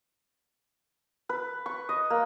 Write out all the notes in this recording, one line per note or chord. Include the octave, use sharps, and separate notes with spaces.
B4
C#6
D#5
A#3